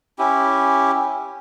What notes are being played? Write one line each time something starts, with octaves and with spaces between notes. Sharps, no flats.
C#4 E4 G4